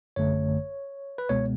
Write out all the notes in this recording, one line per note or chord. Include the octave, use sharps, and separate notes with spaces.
G#1 F#2 D3 A3 C#5
B4
C#2 B2 G#3 B3 C#5